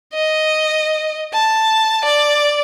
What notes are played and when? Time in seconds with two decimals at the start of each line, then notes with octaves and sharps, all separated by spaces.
0.13 D#5
1.33 A5
2.05 D5